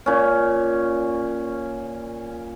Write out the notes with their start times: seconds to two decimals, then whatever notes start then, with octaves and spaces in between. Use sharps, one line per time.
0.06 A#2 C#4